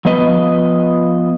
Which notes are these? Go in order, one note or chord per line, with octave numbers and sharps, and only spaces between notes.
F3 B3 B4 D#5